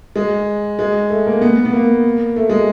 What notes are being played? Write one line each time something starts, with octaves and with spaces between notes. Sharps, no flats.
G#3
G#3
A3
A#3
B3
B3
A#3
A3
G#3